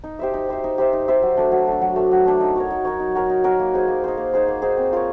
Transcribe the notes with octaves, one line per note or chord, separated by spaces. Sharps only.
D#4
G4 C5 E5
D#4
G4 C5 E5
D#4
G4 C5 E5
D#4
G4 C5 E5
F#3
A3 D4
F#3
A3 D4
F#3
A3 D4
F#3
A3 D4
D#4
F#4 A#4 C#5
D#4
F#4 A#4 C#5
D#4
F#4 A#4 C#5
D#4
F#4 A#4 C#5
A#3
D#4 G#4 C5
A#3
D#4 G#4 C5
A#3
D#4 G#4 C5
A#3
D#4 G#4 C5
C4
F4 A#4 C#5